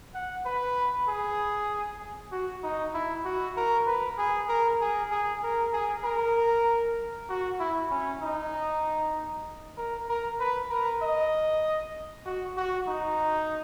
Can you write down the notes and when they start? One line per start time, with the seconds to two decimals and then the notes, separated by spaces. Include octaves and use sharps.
0.14 F#5
0.45 B4
1.08 G#4
2.32 F#4
2.63 D#4
2.94 E4
3.25 F#4
3.57 A#4
3.87 B4
4.18 G#4
4.49 A#4
4.81 G#4
5.11 G#4
5.43 A#4
5.73 G#4
6.04 A#4
7.29 F#4
7.60 E4
7.91 C#4
8.21 D#4
9.77 A#4
10.09 A#4
10.40 B4
10.70 A#4
11.02 D#5
12.26 F#4
12.57 F#4
12.88 D#4